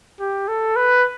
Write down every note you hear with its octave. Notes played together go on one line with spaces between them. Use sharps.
G4
A4
B4